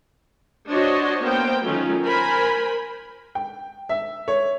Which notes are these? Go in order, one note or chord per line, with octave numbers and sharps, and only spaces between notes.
D4 F#4 C5 C#5 D#5
A#3 B3 C5 G5
D#3 F#3 A3 C#4 D#4 F4
A#4 C5 G#5 B5
G5
E5
C#5